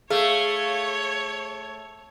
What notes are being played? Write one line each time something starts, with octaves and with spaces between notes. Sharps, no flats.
A3 G#4 C#5 F5